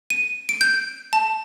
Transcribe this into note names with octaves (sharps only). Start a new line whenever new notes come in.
D#7
D7
G6
A5